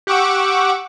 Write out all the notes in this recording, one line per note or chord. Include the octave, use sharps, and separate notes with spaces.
G4 F#5 C#6 D6 E6